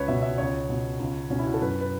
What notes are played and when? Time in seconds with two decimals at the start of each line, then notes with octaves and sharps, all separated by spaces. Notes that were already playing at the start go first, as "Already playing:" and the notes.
Already playing: C#2 B4 C#5
0.08 B2 E5
0.22 E5
0.38 C#2 C#5
0.69 B2
1.00 C#2
1.30 B2 C#4
1.39 E4
1.46 F#4
1.54 A4
1.62 F#2 B4
1.81 B4